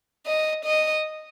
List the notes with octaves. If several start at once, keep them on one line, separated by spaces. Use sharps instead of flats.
D#5
D#5